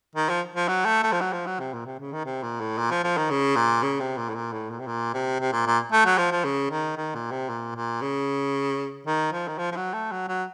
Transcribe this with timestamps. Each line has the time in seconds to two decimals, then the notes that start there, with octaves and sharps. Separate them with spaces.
0.15 D#3
0.29 F3
0.55 F3
0.68 F#3
0.85 A3
1.03 A3
1.12 F3
1.21 F#3
1.33 F3
1.46 F#3
1.59 C3
1.73 A#2
1.86 C3
2.00 C#3
2.13 D#3
2.25 C3
2.43 A#2
2.60 A2
2.78 A#2
2.91 F3
3.04 F3
3.17 D#3
3.30 C#3
3.56 A#2
3.83 C#3
4.00 C3
4.17 A#2
4.29 A2
4.35 A#2
4.53 A2
4.70 A#2
4.80 C3
4.87 A#2
5.14 C3
5.40 C3
5.52 A#2
5.66 A#2
5.92 A3
6.05 F#3
6.18 F3
6.31 F3
6.44 C#3
6.71 D#3
6.97 D#3
7.15 A#2
7.31 C3
7.49 A#2
7.75 A#2
8.02 C#3
9.06 D#3
9.32 F3
9.48 D#3
9.58 F3
9.72 F3
9.76 F#3
9.93 A3
10.12 F#3
10.28 F#3